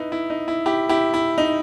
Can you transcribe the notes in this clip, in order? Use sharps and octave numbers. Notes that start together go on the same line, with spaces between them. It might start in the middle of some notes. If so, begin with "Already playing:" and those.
Already playing: D#4 E4 B4
E4
D#4
E4
E4 G4
E4 G4
E4
D#4